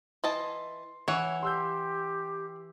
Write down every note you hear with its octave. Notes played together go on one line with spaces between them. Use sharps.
E3 D#5 A5 C6
E3 E4 C#5 F#5
G4 C6 E6 G6